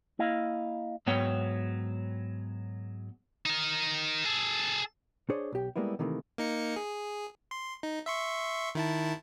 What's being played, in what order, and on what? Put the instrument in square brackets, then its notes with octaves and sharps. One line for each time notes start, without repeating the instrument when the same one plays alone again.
[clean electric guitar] A#3 E4 D#5 F5
[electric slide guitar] G#2 F#3 B3 C#5 G5
[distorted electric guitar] D#4 A#4
G#4 A4
[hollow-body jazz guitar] D4 G#4 C5 C#5
B1 G4
G3 G#3 A#3 B3 E4
C3 D#3 E3 A3 A#3
[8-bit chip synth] A#3 D#4 C#7
G#4
C6
D#4
E5 C6 C#6
D#3 E4 A5